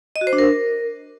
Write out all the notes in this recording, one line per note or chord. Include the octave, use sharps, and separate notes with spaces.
D#5
F#4
C5
D4
A#4